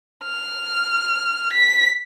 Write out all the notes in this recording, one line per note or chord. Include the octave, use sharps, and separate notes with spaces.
F6
B6